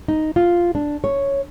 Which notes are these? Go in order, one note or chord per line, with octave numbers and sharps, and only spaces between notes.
D#4
F4
D4
C#5